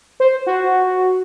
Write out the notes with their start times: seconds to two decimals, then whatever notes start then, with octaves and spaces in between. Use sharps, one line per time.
0.20 C5
0.47 F#4